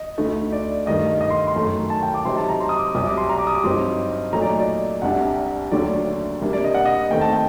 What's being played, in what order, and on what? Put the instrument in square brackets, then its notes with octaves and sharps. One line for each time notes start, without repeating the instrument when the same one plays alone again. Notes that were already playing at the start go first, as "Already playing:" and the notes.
Already playing: [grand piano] D#5
[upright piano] D2 D3 A3 D#4
[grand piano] D5
[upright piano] G2 D#3 A3 [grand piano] D#5
[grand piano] D#5
C6
C6
[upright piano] F#2 D#3 A3
[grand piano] A5
G5
D6
[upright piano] C3 F#3 C4 D#4 [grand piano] C6
[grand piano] A5
A#5
C6
D#6
D6
[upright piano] C2 C3 F#3 [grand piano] D#6
[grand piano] D6
C6
A#5
D6
D#6
D6
[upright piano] G2 F#3 C4 D#4 [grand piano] C6
[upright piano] A#2 F#3 A3 D#4 [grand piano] A#5
[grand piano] D5
D#5
D5
[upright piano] C2 C3 G3 D4 [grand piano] F#5
[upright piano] D#2 D3 F#3 A3 [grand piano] D5
[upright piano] C3 G3 A#3 D4
[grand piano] D5
D#5
F#5
D#5
[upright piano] D#2 D#3 A3 C4 [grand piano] G5
[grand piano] A5
G5